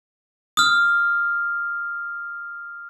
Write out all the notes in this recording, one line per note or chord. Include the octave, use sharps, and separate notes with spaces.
D#6 F6